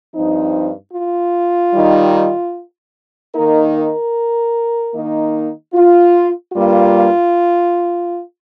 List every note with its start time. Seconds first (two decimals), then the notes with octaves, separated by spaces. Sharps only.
0.14 G2 F3 C4 D#4
0.94 F4
1.74 D#3 G3 D#4
3.33 D#3 A#3 D#4 A#4
3.74 A#4
4.94 D#3 A#3 D#4
5.74 F4
6.53 G2 G3 A#3 F4